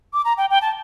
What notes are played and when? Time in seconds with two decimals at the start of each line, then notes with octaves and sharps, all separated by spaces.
0.13 D6
0.25 A#5
0.37 G5
0.50 G5
0.62 A5